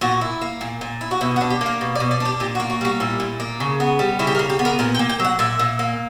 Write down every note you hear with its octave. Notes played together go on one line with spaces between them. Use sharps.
A#2 F#4
E4
A#3
A#2
A#2
E4
F#4
B2 E4
F#4
D4
G4
A#3
A#4
B2
D5
B2
D5
D4
G4
A#2 G4
F#4
A#3
F#4
G3 F#4
A#2 E4
A#2
A#3
C#3
B3
G3
C#3 E4
G4
A#4
C#3
G4
B3
A#4
A#2 A#4
G5
A#3
G5
F#3 F#5
A#2 E5
A#2
A#3